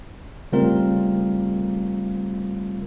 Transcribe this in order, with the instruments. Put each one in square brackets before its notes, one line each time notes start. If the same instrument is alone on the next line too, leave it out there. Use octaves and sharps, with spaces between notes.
[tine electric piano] C#3 G3 A3 C4 F4 A#4